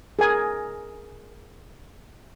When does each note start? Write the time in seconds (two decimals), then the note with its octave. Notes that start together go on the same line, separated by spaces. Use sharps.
0.19 G#4 A#4 G#5